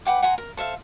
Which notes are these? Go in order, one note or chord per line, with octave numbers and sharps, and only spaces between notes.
B4 F#5 G5 D6
F#5 G#5 A#5 C6
A#4
A4 C5 E5 F5